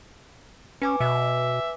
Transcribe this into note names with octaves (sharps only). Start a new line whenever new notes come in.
C#4 B4 G#5 D6
B2 E5